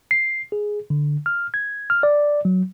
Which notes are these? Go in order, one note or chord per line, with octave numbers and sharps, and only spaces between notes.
C7
G#4
D3
F6
G#6
F6
D5
F#3